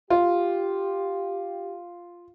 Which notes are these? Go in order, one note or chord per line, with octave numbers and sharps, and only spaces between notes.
F4 G4